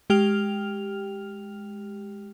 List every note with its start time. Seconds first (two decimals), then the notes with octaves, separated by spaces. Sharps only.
0.10 G#3 G4 G5 F6 F7